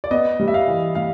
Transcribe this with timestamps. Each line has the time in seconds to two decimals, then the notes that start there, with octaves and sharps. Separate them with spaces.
0.04 D5
0.11 B3 D#5
0.40 G3
0.48 E5
0.54 F5
0.68 E3
0.95 G3 F5